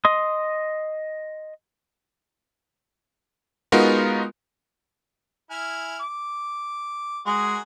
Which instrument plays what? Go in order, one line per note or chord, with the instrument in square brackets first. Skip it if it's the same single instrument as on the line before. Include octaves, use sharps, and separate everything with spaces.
[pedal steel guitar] D#5 C6 D#6
[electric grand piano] G#3 B3 D#4 F4 F#4 A#4
[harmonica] E4 G#5 F6
D6
[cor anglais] G#3 [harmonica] F#4 G#4 A#4